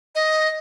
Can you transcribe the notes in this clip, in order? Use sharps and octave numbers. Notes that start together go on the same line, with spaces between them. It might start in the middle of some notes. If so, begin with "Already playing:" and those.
D#5